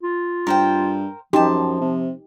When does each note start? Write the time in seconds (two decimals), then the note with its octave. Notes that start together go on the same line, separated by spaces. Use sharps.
0.03 F4
0.47 G2 A#4 C5 G5
1.33 F#2 F3 D#4 G4 A5 C6
1.81 C3